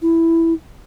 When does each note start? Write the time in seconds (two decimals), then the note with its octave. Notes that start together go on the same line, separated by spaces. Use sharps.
0.02 E4